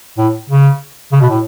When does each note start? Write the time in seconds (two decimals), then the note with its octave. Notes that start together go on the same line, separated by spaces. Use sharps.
0.18 A2
0.50 C#3
1.12 C#3
1.21 B2
1.30 A2